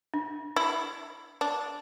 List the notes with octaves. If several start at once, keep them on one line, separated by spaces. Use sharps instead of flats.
D4
E4
D4